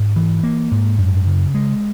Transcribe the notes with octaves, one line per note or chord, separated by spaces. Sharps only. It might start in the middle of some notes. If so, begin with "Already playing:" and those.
Already playing: G#2
E3
A#3
G#2
F#2
C#3
G#3